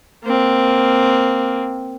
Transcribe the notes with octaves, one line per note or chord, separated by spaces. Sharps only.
A#3 C4